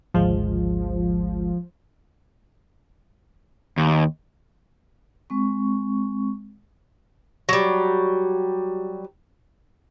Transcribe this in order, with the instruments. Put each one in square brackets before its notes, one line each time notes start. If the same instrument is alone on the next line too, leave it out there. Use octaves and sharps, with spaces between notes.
[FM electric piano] G#1 D2 G#3 [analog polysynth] F3
[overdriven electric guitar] D#2
[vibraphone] G#3 C4 C#6
[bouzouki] F#3 G3